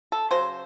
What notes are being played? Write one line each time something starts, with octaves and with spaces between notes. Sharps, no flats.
A4
C#3 F#3 C5